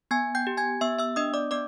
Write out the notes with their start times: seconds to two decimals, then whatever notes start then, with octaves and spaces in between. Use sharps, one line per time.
0.11 B3 G#5 G#6
0.35 G5 G6
0.47 G4
0.57 G#5 G#6
0.81 B3 E5 E6
0.99 E5 E6
1.16 D4 D#5 D#6
1.34 D5 D6
1.51 B3 D5 D6